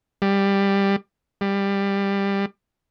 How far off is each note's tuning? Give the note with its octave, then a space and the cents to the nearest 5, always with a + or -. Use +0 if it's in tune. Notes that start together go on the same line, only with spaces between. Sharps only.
G3 +10
G3 +15